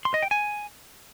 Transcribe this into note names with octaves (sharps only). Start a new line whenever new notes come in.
C6
D#5
G5
G#5